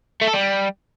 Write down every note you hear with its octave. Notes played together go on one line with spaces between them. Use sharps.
A3
A4
G3